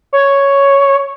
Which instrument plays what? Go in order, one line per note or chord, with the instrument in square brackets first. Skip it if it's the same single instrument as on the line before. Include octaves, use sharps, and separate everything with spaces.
[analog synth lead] C#5